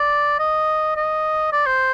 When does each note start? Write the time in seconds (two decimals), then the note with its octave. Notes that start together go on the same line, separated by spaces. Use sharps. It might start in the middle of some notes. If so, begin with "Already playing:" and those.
Already playing: D5
0.39 D#5
0.96 D#5
1.52 D5
1.66 C5